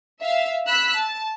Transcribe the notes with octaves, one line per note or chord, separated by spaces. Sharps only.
E5 F5
B5 E6 F#6 B6
A5